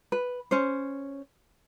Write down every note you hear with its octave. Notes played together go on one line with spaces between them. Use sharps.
B4
C#4 C5